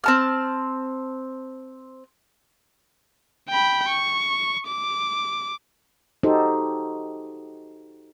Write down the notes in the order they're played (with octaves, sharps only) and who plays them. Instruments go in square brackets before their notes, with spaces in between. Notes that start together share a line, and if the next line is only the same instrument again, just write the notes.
[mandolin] C4 A5 F6
[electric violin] G5 B5
C#6
D6
[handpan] D#4 F#4 G4 A4 C5